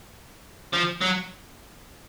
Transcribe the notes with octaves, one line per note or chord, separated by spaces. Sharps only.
F3
F#3